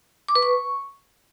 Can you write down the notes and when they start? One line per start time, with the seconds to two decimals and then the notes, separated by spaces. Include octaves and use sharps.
0.28 D6
0.35 B4
0.42 C#6